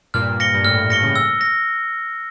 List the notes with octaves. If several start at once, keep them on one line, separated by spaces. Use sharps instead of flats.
G2 A#2 F6
A#6 C#7 G7
G2
A2 F6
G2
A2 A#6 C#7 G7
A2 C#3
E6
A#6